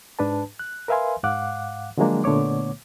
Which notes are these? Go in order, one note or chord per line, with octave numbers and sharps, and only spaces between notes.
G#2 D4 B4 A5
F#6
A#4 B4 E5 F5 G#5 C6
G#2 F5 F#5 D6 F#6
D3 F3 F#3 G#3 A#3 D4
A#2 D3 A3 B3 C#5 D6